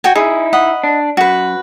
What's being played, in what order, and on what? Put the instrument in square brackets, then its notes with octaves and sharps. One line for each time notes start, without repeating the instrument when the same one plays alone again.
[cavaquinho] F#4 G5 G#5
[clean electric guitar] D#4 E4 [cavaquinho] G#4
[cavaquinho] D#5 F#5 B5
[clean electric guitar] D4
[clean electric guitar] F#2 [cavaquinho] F#4 B4